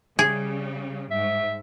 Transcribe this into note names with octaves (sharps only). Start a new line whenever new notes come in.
C#3 G3 G#4
G#2 E5